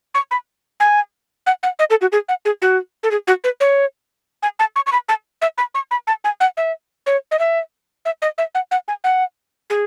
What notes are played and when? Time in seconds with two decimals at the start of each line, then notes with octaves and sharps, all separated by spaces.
0.15 C#6
0.31 B5
0.80 G#5
1.47 F#5
1.63 F#5
1.79 D#5
1.90 A4
2.01 F#4
2.12 G#4
2.29 F#5
2.45 G#4
2.62 F#4
3.03 A4
3.11 G#4
3.27 F#4
3.44 B4
3.60 C#5
4.43 G#5
4.59 A5
4.76 C#6
4.87 C#6
4.92 B5
5.09 A5
5.42 E5
5.58 B5
5.75 C#6
5.91 B5
6.07 A5
6.24 G#5
6.40 F#5
6.57 E5
7.06 C#5
7.31 D#5
7.39 E5
8.05 E5
8.22 D#5
8.38 E5
8.55 F#5
8.71 F#5
8.88 G#5
9.04 F#5
9.70 G#4